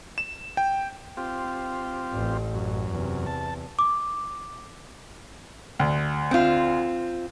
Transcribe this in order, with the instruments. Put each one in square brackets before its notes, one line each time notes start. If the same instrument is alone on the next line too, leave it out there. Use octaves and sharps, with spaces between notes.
[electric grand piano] E7
G5
[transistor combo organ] C4 F4 G4
[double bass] A1
[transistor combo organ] F#2
[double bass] E2 C3
[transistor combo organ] A5
[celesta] D6
[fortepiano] D2
[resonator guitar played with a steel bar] C4 F4